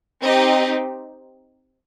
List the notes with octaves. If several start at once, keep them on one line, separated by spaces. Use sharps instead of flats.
C4 D#4 G4 D#5